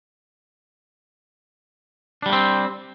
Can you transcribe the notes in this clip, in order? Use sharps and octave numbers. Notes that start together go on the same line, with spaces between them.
G3 A#3 C4 D4